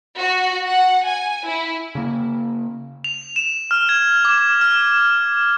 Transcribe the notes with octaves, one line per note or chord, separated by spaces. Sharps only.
F#4
F#5
G#5
E4
C#3 A#3
F7
E7
F6
G#6
D6
F6